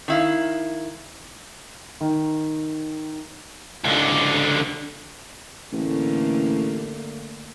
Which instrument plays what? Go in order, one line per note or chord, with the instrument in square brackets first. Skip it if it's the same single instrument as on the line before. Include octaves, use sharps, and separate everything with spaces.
[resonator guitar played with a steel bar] D#3 E4 F5
[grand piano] D#3
[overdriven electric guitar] C#2 D3
[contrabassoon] A1 [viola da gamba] D3 A3 A#3